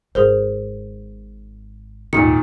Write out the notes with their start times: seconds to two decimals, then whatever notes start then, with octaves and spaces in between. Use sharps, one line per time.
0.15 G#1 G#4 A#4 C5
2.13 G#1 D#2 A#2 D#3 A#5 C#7